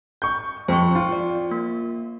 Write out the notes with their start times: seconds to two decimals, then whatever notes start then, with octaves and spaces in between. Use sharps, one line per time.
0.22 C#6 G6
0.68 F2 C5 G5 C#6
0.95 F4
1.12 D5
1.51 A#3